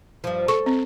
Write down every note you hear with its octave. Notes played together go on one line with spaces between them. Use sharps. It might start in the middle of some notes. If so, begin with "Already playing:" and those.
G2 F3
A4 C#6
C4